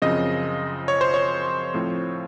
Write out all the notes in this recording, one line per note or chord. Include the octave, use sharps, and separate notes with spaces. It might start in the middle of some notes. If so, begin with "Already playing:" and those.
F#2 C#3 F3 C4 D#5
C#5
C5
C#5
A2 F3 C4